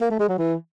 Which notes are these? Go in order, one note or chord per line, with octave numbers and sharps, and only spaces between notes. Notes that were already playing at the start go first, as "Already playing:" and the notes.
A#3
A3
G#3
F#3
E3